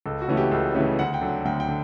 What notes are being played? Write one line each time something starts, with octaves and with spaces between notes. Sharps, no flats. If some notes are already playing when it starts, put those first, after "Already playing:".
C#2 A4
F#4
C#3 E3 A3 C#4
G4
C#2 A4
C#3 E3 A3 C#4
D2 F#5
G5
D3 F#3
D2 G5
G5
D3